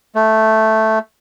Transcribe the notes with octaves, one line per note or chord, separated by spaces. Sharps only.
A3